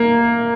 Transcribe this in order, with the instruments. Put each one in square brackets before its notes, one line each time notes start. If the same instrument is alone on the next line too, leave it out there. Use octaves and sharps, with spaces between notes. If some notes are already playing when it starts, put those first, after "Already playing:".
Already playing: [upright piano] A#3